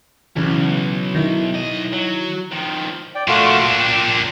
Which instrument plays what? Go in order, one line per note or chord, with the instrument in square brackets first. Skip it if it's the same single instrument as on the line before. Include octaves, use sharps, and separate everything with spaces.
[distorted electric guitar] B1 [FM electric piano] C#3 E3
[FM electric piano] D#3 D#4 E4
[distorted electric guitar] B1 D#5
F#3
D#3 F3
[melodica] D5 G5
[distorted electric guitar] A#2 D4 [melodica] A3 F4 F#4
[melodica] G5